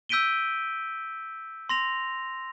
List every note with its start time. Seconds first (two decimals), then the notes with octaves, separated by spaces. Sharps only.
0.09 E6 G6 B6 D7 D#7 G7
1.69 C6 A#6 F7